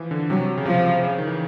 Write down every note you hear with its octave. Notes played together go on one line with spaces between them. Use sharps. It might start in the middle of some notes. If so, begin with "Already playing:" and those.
Already playing: E3 F3
D3
C3 F#3
C#3
C3 F3
C#3
D#3
E3